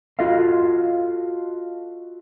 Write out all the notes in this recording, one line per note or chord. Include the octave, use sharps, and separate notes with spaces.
F4 F#4 A4 D#5 F5